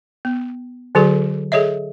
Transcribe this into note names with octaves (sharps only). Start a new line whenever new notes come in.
B3
D3 F#3 F#4 G#4 A4 D5
G#4 A4 C#5 D#5 E5